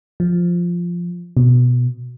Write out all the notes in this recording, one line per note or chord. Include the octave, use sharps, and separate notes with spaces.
F3
B2